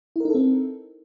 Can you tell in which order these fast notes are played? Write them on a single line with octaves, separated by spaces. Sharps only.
E4 A#4 D#4 A4 C4